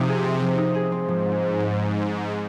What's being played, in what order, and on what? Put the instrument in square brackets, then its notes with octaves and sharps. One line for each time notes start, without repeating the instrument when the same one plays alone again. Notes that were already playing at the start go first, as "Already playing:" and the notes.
Already playing: [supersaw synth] C3 [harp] F3 D#4
[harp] G#4
C4
F3
D#4
G#4
[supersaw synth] G#2 [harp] C4
[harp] F3